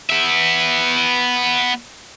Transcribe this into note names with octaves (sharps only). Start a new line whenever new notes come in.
B3 E5